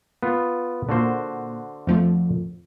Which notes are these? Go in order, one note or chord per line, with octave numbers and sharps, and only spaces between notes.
B3 F4
A#2 D3 A#3 F#4 C5
F2 F3 A3